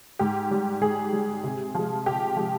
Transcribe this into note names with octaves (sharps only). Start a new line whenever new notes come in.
G#2 G4
G3
G#2 G#4
G3
C3
F3 G#3
C3 G4
F3 G#3